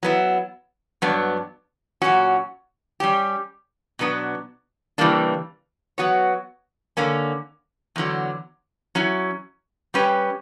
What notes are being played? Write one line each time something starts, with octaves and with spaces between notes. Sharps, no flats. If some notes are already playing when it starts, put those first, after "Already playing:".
F#3 B3 E4
G2 F#3 B3 D4
A#2 F#3 C#4 F#4
G3 C#4 G4
B2 F#3 B3 D4
C#3 E3 G3 A#3 D4
F#3 B3 F#4 C#5
D3 A#3 C#4
E2 D3 F#3
F#3 C#4 E4
G3 C#4 G4 B4